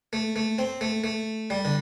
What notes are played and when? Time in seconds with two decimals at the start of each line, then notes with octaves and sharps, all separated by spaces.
0.13 A3
0.36 A3
0.58 C4
0.81 A3
1.04 A3
1.50 G3
1.65 D3